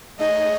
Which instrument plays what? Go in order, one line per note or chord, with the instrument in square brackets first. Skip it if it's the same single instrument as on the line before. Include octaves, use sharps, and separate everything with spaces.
[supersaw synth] A3 D#4 G#4 C#5 [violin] D#5